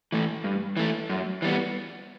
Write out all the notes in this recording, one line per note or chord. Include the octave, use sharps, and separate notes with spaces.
E3 A3
G2
E3 A3
F#2
E3 G3 B3